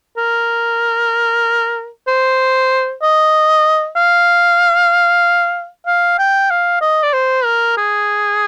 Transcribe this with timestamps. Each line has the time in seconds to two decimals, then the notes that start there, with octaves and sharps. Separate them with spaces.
0.18 A#4
2.08 C5
3.03 D#5
3.96 F5
5.86 F5
6.19 G5
6.50 F5
6.81 D#5
7.03 D5
7.13 C5
7.45 A#4
7.77 G#4